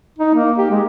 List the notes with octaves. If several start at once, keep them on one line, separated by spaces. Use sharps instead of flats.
D#4
A#3
G4
G#3